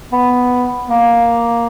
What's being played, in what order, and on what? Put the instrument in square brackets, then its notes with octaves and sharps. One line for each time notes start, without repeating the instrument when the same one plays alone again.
[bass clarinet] B3
A#3